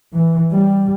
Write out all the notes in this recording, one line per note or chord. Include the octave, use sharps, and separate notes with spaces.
E3
G3